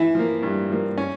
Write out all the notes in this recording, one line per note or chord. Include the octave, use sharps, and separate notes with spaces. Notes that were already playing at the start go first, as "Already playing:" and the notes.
Already playing: E3 E4
F3 A#3
G2
F3 A#3
C#4